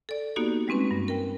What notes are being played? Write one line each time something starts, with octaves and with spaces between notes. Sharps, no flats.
A4 D5
A#3 B3 D#4 F#4 G4
G3 G#3 C4 C#4 B4
G2
A#4 G5